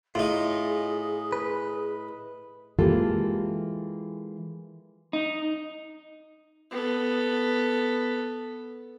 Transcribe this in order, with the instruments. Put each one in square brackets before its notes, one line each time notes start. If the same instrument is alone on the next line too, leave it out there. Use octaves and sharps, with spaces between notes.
[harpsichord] A2 D#4 [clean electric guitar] F4 [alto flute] G#4
[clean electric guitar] B4
[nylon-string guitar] E3 G#3 A#3 F4 G4 A4
[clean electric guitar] D#4
[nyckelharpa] B3 A4